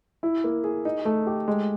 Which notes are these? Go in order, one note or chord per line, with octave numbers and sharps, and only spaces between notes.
E4
A#3
G#4
D#4
A3
G4
G#3